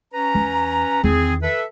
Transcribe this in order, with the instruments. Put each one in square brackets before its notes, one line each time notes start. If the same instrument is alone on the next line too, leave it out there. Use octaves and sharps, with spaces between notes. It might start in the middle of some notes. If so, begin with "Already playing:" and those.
[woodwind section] C#4 B4 A#5
[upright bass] E2
[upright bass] E2 D#3 [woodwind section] C4 G#4
[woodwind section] A4 B4 E5